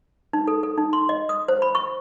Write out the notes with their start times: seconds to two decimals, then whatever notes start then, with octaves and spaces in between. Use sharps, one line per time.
0.33 D#4
0.47 A4
0.63 A4
0.78 D#4
0.93 C6
1.09 D#5
1.29 D#6
1.48 C5
1.62 B5
1.75 C#6